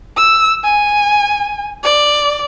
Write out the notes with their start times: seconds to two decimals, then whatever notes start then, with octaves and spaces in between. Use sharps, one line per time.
0.17 E6
0.64 G#5
1.84 D5